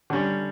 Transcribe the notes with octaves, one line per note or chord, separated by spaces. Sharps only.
D3 G3 C#4